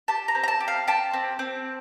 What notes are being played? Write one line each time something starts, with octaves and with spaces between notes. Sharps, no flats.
G4 A5
A#5
C4
A#5
A5
G4
F5
G4 A5
C4
C4